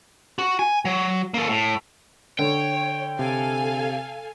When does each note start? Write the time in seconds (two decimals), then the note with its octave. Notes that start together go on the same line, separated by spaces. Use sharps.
0.39 F#4
0.59 G#5
0.85 F#3
1.34 A#3 A4
1.49 A2
2.39 D3 C#5 G5
3.19 C3 A4 F5 G#5